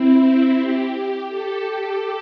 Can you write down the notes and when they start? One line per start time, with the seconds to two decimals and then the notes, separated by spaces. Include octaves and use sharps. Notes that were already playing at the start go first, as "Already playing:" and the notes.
Already playing: C4 E4
0.59 G4
1.29 A4